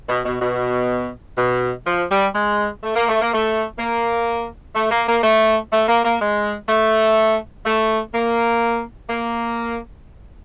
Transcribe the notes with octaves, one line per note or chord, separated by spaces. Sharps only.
B2
B2
B2
B2
F3
G3
G#3
A3
A#3
A3
A#3
A3
A#3
A3
A#3
A#3
A3
A3
A#3
A#3
G#3
A3
A3
A#3
A#3